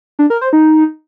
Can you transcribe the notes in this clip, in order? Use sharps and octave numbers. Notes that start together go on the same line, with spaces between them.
D4
A#4
C5
D#4